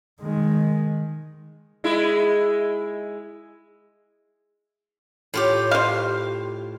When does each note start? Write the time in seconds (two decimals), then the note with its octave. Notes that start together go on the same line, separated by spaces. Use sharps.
0.21 D#3 G#3
1.84 G#3 E4
5.34 A2 F4 G4
5.71 C5 F5